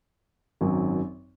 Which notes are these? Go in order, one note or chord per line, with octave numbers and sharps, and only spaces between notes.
G#1 F#2 D#3 F#3